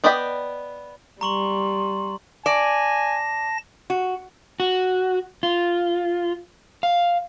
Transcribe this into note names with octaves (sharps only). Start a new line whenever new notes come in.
B3 D5 D#5 G5 B5
G3 A#5 C6 C#6 F#7
D5 G#5 A5 A#6
F#4
F#4
F4
F5